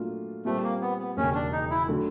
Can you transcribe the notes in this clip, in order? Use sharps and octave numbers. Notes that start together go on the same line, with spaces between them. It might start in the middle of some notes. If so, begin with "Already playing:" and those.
Already playing: A#2 F#3 A3 D4 F4
A#2 G3 A3 C4
A#3
B3
B3
E1 D#2 C#3 C#4
D4
D#4
E4
D3 F#3 A3